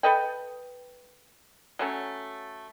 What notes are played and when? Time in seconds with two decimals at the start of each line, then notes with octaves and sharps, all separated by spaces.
0.03 A4 B4 D#5 G5
1.79 F#3 A3 C#4